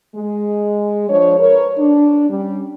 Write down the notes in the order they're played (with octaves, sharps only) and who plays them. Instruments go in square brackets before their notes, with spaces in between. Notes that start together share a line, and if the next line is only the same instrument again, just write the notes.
[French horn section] G#3
F3 D4 C5 C#5
A#4 B4 C#5
D4
G3 C#4